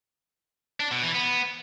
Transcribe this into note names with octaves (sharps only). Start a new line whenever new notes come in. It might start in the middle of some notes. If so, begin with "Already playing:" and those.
D4
B2
E3
B3